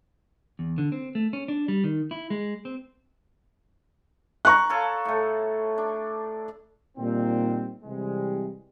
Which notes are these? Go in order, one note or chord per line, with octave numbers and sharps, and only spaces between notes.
E2
D3
C4
A3
C#4
D4
G3
D#3
E4
G#3
C4
A#5 C#6 F#6
F4 A4 C#5
A2 A3
D4
A#2 D#3 G3 C4
C3 E3 G3 G#3